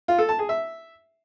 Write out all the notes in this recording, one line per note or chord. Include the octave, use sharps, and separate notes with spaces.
F4
A4
A5
G#4
E5